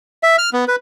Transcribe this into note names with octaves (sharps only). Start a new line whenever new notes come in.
E5
F6
B3
B4